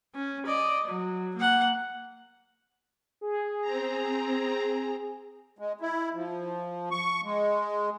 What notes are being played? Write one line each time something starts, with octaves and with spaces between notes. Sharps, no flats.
C#4
D5 D#5
F#3
A#3 F#5
G#4
C4 A#5
G#3
E4
F3
C#6
G#3